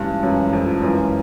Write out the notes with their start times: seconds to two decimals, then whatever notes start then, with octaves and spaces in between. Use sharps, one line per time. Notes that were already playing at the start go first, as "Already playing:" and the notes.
Already playing: G2 E3 G#3 C#4 F4
0.23 F#2 E3 G#3 C#4 F4
0.53 F2
0.82 F#2 E3 G#3 C#4 F4